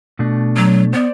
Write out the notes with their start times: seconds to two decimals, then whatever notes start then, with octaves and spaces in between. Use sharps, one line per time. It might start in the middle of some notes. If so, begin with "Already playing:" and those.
0.19 B2 A3 D4
0.57 F#3
0.93 B3 C5 D5